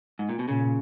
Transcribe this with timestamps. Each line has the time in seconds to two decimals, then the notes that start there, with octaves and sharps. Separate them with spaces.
0.19 G#2
0.29 A#2
0.39 B2
0.48 A#2 C#3